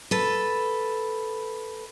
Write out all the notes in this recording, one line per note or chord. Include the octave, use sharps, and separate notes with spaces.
A4 B4